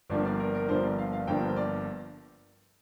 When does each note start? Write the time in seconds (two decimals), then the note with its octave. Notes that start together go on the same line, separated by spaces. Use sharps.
0.10 G1 G2 F3 A#3 D4 D5
0.25 D5
0.40 A#4
0.55 A#4
0.68 G1 G2 F3 A#3 D4 C5
0.84 D5
0.98 F5
1.13 F5
1.27 G1 G2 F3 A#3 D4 G5
1.45 C5
1.56 D5